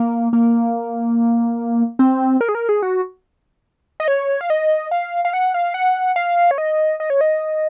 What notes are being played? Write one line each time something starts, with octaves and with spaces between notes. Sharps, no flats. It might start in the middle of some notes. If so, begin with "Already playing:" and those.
Already playing: A#3
A#3
C4
A#4
G#4
A#4
G#4
F#4
D#5
C#5
F5
D#5
F5
F5
F#5
F5
F#5
F5
C#5
D#5
D#5
C#5
D#5